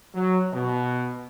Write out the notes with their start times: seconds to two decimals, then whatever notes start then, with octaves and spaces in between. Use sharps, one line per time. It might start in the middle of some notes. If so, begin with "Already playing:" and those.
0.15 F#3
0.53 B2